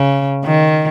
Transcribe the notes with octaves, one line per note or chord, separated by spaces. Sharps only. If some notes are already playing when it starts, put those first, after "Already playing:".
Already playing: C#3
D#3